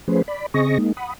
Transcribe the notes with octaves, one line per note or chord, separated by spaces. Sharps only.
F3 A3 C#4 G#4 B4 C5
D5 B5
C#3 C4 G#4 D#5 C#6 A#6
G#3 A#3 D#4
F#5 B5 D#6